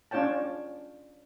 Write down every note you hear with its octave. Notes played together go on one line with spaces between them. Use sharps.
C#4 D4 F4 C#5 G5 A5